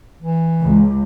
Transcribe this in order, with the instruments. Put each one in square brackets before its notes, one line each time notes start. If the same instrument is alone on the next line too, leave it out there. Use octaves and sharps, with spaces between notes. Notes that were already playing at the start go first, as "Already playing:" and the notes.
[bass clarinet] E3
[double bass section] C#2